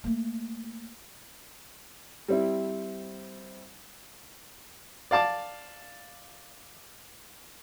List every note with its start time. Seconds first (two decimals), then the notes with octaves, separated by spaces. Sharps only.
0.04 A3 A#3
2.28 G3 C4 E4
5.11 D5 F5 A5 D6